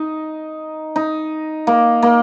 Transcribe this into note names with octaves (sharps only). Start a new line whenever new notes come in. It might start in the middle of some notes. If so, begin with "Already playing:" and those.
Already playing: D#4
D#4
A#3
A#3